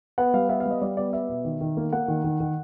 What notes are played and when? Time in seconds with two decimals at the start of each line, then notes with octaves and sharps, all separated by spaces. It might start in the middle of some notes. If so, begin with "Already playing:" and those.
0.18 B3 F#5
0.34 G3 F5
0.49 B3 E5
0.60 F5
0.66 G3
0.71 D#5
0.81 G3 D5
0.97 B3 D5
1.13 B3 E5
1.29 B2
1.45 D#3
1.61 D#3
1.77 A#3
1.93 A#3 F#5
2.08 D#3
2.24 D#3
2.40 D#3